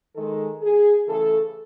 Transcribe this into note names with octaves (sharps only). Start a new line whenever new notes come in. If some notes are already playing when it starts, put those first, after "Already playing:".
D#3 G#3 A4
G#4
C#3 E3 A3 A4